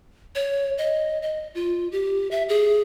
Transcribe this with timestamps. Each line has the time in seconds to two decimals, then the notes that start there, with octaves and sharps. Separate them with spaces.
0.35 C#5
0.78 D#5
1.22 D#5
1.55 F4
1.92 G4
2.31 E5
2.49 G#4